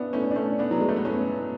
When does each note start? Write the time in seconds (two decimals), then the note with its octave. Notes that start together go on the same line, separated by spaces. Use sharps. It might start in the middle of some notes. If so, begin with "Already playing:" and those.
Already playing: B3 C#4 D4 E4
0.13 A3 C#4
0.31 D4
0.36 A3 C#4
0.59 B3 D4
0.71 F#3
0.80 G#3
0.89 A3
0.97 B3
1.05 A3 C#4